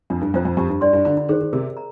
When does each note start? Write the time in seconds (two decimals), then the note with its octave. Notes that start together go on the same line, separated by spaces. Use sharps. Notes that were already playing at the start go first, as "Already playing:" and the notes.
0.10 F2 D4
0.21 G2
0.34 F2 F4 C5 G5
0.45 F2
0.57 F2 G4
0.69 G2
0.81 G2 D5 G5 C6
0.93 G2
1.05 D3 F4
1.17 D3
1.29 D#3 G#4 C5
1.41 D#3
1.53 C3 A#4
1.77 A#5